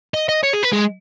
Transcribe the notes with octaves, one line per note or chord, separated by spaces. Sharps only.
D#5
D#5
C#5
G#4
B4
G#3